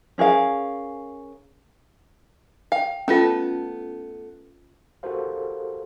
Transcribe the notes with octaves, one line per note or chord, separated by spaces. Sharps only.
C#4 G#4 A#4 F5
F5 G5
A3 B3 C#4 F4 A4
F#4 G4 A4 A#4 C5 F5